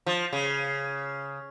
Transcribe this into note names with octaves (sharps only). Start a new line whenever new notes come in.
F3
C#3